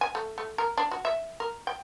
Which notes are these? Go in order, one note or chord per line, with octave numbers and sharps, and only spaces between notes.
G#5
A3
A3
A#4
D4
F#4
E5
A#4
G5